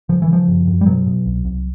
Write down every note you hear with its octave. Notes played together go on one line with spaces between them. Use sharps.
C#3 F3
E3
C#3 F3
F#2
F#2
G3
B2 F#3
B2
C2
C2